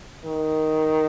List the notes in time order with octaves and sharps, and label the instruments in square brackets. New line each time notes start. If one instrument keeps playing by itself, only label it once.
[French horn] D#3